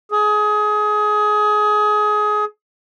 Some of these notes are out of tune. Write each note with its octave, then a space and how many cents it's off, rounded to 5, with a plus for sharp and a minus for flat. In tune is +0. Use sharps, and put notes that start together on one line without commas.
G#4 +20